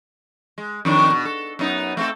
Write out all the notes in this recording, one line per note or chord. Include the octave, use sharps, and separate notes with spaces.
G#3
F2 D#3 D4
B2
A4
F#2 B3 D#4
A3 C4 A4